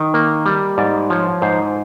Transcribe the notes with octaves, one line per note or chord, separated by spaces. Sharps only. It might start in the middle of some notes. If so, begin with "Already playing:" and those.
Already playing: D#3 D#5
A#3
G3
G#2 D5
F3 C#5
G#2 C5